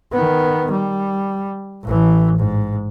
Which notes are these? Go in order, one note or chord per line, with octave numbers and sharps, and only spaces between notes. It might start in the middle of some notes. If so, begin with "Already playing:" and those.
D#3 B3
G3
A1 E3
G#2